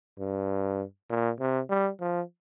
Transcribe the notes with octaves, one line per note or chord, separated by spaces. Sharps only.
G2
A#2
C3
G3
F3